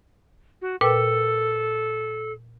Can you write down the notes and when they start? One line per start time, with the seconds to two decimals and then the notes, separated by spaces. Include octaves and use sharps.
0.61 F#4
0.81 A#2 A4 B4 G5